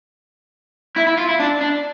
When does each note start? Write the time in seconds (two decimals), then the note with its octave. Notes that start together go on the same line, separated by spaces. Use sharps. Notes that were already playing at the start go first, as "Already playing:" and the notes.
0.97 E4
1.07 E4
1.18 F4
1.29 E4
1.40 D4
1.61 D4